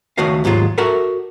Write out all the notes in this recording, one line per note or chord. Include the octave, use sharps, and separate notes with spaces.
C#2 D#3 A3 F#4 D#5 F5
D#2 G#2 F#3 G#3 F4
F#4 A4 A#4 E5 F#5